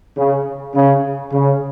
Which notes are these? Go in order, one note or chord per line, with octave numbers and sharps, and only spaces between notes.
C#3
C#3
C#3